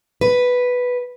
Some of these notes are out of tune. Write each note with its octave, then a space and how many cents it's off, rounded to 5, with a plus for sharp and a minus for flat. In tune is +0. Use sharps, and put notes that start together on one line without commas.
B4 +0